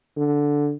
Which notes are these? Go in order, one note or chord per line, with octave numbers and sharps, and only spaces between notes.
D3